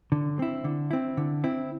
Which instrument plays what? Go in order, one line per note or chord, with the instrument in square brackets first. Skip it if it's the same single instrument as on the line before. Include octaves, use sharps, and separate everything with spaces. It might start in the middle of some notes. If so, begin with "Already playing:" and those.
[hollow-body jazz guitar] D3
C4 E4
D3
C4 E4
D3
C4 E4